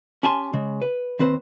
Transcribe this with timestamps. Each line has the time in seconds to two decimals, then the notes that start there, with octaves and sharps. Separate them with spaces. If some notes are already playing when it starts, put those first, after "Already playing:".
0.23 C#4 G4 G#5 A5 C6
0.53 C#3 G#3
0.82 B4
1.19 D#2 C4 B4 C5